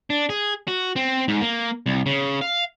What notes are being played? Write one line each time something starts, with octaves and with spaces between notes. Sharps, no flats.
D4
G#4
F#4
C4
G#2
A#3
C2
C#3
F5